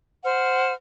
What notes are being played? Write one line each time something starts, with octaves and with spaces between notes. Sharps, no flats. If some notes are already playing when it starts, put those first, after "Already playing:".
C5 F#5 F6